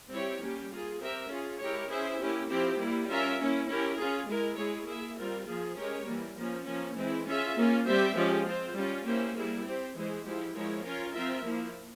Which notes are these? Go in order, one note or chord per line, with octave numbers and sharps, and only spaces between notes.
G3 C4 E4 G4 C#5
G3 A#3 C#4 G4
A#3 F4 G#4
C4 G4 A#4 E5
C#4 F4 G#4
G#3 E4 G4 A#4 C#5
C#4 E4 G#4 C5 E5
A#3 C#4 E4 G4
F3 C4 E4 G4 C5
G3 A#3 E4
C#4 F4 A#4 E5
A#3 C#4 E4
C#4 E4 G4 A#4
C#4 F4 G#4
G#3 E4 A#4
G#3 E4 G#4 C#5
A#3 E4 G#4 E5
G3 C4 F4 A#4
F3 A#3 F4 G#4
G#3 C#4 G4 A#4 C#5
E3 G3 A#3
F3 A#3 C#4
F3 A#3 C#4
E3 G#3 C4 E4
C#4 F4 G#4 E5
A#3 C#4 F4
G3 C4 G4 C5 E5
F3 G#3 C#4 G4
C4 F4 C5
G3 C#4 F4
A#3 C#4 E4 G4 C5
G3 A#3 E4 G#4
C4 G4 C5
E3 G#3 E4 G#4 C5
F3 G#3 E4 G4
F3 G#3 E4 A#4 C#5
C#4 F4 A#4 C#5
F3 C4 F4 A#4 E5
F3 A#3 E4